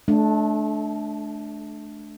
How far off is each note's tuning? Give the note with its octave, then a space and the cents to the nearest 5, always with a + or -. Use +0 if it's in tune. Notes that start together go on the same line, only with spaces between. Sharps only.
A3 -30 D4 +0